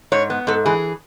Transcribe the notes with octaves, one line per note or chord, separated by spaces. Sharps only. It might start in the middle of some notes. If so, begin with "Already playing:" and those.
G#2 C#5
B3
G#2 A4
E3 G#4